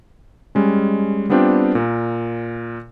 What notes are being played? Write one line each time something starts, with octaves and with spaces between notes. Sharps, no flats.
G3 G#3 C#4
G3 B3 C4 D4 F4 G4
A#2 A#4